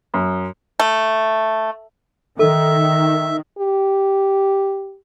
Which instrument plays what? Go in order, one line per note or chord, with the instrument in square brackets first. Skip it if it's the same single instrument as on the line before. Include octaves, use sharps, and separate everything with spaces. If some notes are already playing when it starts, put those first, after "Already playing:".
[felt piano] F#2
[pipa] A3
[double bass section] D#3 [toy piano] A4 [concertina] E5
[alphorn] G4